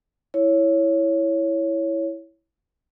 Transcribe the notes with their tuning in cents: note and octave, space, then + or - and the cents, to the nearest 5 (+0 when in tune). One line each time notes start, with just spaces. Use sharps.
E4 +0 C#5 +0